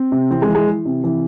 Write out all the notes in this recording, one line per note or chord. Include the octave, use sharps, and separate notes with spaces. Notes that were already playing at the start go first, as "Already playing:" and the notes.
Already playing: C4
C3
E3 C4
G#3
E3
G#3
E3
C3
E3